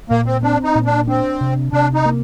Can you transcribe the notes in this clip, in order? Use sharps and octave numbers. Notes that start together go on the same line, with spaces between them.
A#2 A#3
C4
C4 D4
D#4
A#2
D4
C4 D4
C3
C3 D4
D#4
A#3